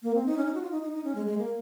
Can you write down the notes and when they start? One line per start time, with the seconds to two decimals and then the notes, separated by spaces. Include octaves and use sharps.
0.03 A#3
0.15 C4
0.26 D#4
0.37 C#4
0.45 D#4
0.54 F#4
0.62 F4
0.71 D#4
0.82 D#4
0.92 D#4
1.04 C#4
1.15 G#3
1.26 G#3
1.38 A#3